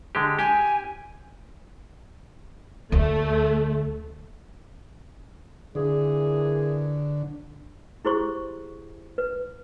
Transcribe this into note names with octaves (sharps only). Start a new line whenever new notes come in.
D3 G#3 G4
G4 G#5
D2 A3
A#2 D3 E3 G#4
E4 G4 G#4 C5 C6 C#6
B4